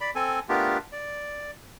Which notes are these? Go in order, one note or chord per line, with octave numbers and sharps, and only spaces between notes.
D5 B5
C4 A4 G#5
A3 B3 D4 F4 G4 A#4
D5